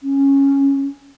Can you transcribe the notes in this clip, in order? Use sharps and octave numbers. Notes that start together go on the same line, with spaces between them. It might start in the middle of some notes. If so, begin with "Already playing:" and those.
C#4